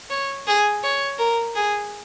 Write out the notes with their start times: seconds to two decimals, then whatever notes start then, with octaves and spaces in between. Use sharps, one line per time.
0.10 C#5
0.47 G#4
0.83 C#5
1.19 A#4
1.55 G#4